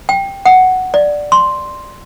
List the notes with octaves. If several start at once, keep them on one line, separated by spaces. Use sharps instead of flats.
G5
F#5
D5
C6